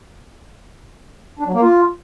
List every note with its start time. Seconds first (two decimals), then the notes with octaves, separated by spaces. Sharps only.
1.39 D4
1.47 F#3
1.54 A#3
1.62 F4